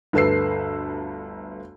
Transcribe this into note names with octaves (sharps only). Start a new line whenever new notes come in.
G1 D2 A4 B4 E6 C7